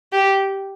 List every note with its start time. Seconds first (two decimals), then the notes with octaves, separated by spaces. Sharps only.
0.13 G4